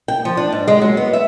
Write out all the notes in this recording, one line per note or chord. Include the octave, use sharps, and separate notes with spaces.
G5
F3
D4
G#2
G#3
F#3
B3
E5